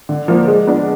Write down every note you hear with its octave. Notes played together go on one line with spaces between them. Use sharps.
D3
F3 A#3
G#3
B3 D4